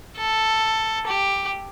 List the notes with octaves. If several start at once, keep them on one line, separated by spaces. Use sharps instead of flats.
A4
G4